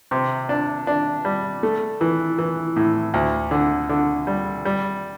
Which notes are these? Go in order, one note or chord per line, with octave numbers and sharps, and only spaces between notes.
C3
D4
D4
G3
A3
E3
E3
A2
D2
D3
D3
G3
G3